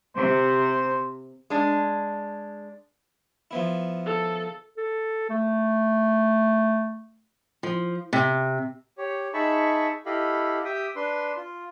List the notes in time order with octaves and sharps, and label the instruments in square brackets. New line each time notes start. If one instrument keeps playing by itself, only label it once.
[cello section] C3 [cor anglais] C5
[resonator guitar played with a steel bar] G#3 D4
[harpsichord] F3 B3 E4
[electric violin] A4
[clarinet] A4
A3
[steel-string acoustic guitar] F3
C3
[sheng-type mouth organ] G4 C#5
D#4 G#4 E5 A5 B5 C#6
E4 G4 A4 D#5 F5 B5
G4 E5 G5 D#6
D4 B4 C6
F4